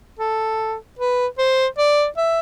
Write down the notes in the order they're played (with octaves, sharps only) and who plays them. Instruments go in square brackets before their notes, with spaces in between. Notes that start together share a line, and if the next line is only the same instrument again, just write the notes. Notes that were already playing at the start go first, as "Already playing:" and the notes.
[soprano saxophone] A4
B4
C5
D5
E5